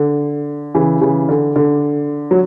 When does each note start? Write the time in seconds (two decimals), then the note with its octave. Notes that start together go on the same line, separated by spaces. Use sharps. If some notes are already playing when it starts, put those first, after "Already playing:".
Already playing: D3
0.75 C#3 E3
1.01 C#3 E3
1.29 D3
1.56 D3
2.31 F#3